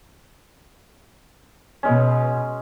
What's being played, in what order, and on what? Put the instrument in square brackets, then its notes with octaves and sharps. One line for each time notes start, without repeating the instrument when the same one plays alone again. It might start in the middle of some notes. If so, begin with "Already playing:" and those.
[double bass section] B2 [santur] G#3 C#4